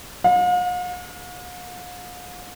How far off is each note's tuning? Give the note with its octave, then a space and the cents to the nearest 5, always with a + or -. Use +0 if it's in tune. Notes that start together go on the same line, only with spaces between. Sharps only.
F5 +45